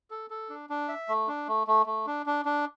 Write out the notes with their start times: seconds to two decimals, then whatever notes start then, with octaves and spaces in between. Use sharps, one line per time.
0.11 A4
0.30 A4
0.50 D4
0.70 D4
0.89 E5
1.09 A3
1.28 D4
1.48 A3
1.67 A3
1.86 A3
2.07 D4
2.26 D4
2.45 D4